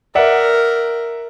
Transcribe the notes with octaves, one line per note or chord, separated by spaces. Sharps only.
A#4 D5 E5 F#5